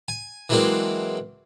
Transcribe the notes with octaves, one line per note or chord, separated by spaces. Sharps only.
G#5
E3 F#3 G#3 A#3 C4 D4